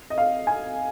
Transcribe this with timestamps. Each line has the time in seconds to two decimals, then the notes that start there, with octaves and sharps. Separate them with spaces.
0.10 D#5
0.18 F5
0.47 G#5